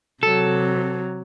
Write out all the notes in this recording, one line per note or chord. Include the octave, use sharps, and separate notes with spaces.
C3 F#3 A4